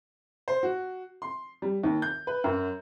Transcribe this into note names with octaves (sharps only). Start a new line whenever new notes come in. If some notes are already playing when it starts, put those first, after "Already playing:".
C5
F#4
C6
G3
D#2
G6
B4
F#2